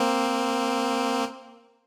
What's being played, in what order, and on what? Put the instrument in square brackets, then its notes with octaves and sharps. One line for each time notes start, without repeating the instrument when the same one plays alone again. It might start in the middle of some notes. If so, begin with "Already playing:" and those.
Already playing: [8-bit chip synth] A#3 C4